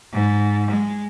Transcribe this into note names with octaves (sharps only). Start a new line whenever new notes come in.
G#2
G#3